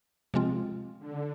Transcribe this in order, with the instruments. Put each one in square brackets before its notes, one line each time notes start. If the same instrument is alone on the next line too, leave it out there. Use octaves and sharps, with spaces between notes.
[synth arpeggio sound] C3 F3 G#3 C4 F4
[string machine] D3